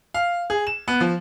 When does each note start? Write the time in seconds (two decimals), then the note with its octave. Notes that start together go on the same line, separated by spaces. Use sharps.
0.14 F5
0.50 G#4
0.67 E7
0.88 B3
1.00 F3